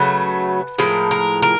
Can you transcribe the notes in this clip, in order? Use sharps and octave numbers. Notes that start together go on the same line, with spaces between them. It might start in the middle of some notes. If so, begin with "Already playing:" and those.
Already playing: C#3 F#3 A3 B4
A2 F3 G#3 A#4
A#4
A#4